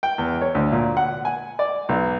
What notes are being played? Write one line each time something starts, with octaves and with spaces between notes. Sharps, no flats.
G5
E2
C#5
D2
A#2
F#5
G#5
D5
B1